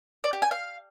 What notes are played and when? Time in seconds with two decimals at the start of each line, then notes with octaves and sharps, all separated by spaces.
0.24 D5
0.33 G4
0.42 G#5
0.51 F5